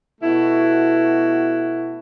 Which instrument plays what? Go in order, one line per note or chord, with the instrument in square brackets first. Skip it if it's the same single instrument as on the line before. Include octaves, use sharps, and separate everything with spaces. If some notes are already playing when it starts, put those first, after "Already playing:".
[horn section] B2 A3 E4 F#4